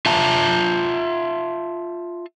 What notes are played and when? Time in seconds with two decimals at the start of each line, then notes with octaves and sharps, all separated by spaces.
0.06 F4 E5 A5 A#5